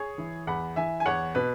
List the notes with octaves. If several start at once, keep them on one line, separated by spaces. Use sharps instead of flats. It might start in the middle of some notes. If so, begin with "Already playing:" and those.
Already playing: G#4 C#5
E3
E2 F#5 B5
E3 E5 G#5
G#5
E2 C#5 F#5
B2 B4